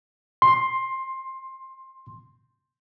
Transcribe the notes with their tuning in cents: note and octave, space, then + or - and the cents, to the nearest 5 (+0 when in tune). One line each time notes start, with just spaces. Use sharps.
C6 +10